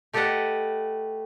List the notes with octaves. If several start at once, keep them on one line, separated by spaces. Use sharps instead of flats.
A3 G4 A4 B4 D#5 F#5